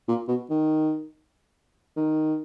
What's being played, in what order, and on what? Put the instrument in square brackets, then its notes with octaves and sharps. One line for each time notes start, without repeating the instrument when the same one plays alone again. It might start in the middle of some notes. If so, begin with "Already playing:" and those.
[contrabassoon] A#2
B2
D#3
D#3